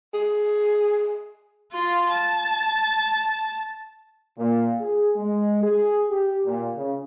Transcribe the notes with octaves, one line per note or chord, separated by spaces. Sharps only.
G#4
F4 C6
A5
A#2
G#4
G#3
G#4
G4
A#2
C#3